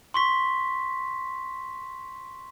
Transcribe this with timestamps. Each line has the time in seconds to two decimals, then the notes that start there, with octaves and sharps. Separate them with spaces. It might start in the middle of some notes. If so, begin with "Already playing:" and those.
0.14 C6 C#6 B6